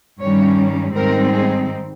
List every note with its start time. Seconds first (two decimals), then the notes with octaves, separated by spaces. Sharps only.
0.20 G2 D#3 G3 C#4 C#5
0.95 G#2 D#3 G3 C4 D#4 A#4
1.32 G#4